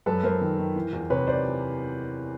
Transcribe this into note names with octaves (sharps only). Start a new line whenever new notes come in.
F#2 A4 B4
F#2 A#4 C5
D#3
D#3
E3
E2
C3 B4 C#5
C5 D5